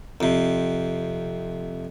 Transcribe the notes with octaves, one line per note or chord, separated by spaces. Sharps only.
F2 C3